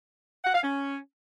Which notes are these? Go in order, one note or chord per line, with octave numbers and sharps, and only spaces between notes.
F#5
F5
C#4